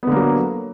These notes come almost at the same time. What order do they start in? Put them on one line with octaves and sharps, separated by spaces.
B3 D3 A#3 F#3